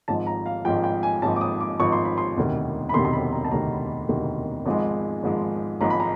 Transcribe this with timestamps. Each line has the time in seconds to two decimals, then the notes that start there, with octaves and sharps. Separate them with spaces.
0.08 G#1 G#2 F3 A5
0.27 A#5
0.46 F5
0.65 G#1 G#2 F3 G5
0.84 G5
1.03 G#5
1.22 G#1 G#2 F3 A5
1.36 D6
1.41 D#6
1.61 D6
1.80 G#1 G#2 F3 C#6
1.92 C6
2.05 B5
2.18 C6
2.36 E1 D2 C3 D#3
2.89 B5
2.94 E1 D2 C3 D#3 C6
3.05 C6
3.13 B5
3.32 A#5
3.44 A5
3.51 E1 D2 C3 D#3 A#5
4.08 E1 D2 C3 D#3
4.66 G#1 G#2 F3 G#3
5.23 G#1 G#2 F3 G#3
5.81 G#1 G#2 F3 G#3 A#5
5.90 B5
6.00 A#5